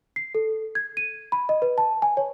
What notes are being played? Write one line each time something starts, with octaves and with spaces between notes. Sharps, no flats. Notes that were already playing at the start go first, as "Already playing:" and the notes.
C7
A4
G#6
D#7
B5
D#5
B4
A5
G#5
C#5